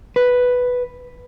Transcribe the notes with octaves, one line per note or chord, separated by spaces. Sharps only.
B4